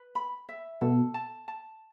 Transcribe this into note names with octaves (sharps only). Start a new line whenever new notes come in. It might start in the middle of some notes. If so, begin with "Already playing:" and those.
Already playing: B4
B5
E5
B2 A4
A5
A5